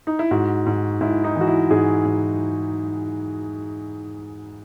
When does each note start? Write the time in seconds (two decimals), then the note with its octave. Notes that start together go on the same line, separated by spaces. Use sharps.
0.07 D#4
0.19 E4
0.31 G#2 F#4
0.66 G#2
1.01 G#2 E4
1.24 D#4
1.36 E3 F#4
1.47 E4
1.71 G#2 G#4
2.05 G#2